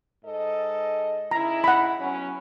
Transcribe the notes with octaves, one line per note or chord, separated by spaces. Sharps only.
G#2 A4 D#5
C#3 D#4 E4 A#5
F#5 B5
F#3 B3 C#4